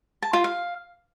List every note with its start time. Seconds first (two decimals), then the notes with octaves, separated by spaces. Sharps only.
0.22 A5
0.33 F4
0.44 F5